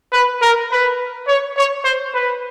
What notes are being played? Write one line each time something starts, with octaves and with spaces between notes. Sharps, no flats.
B4
A#4
B4
C#5
C#5
C5
B4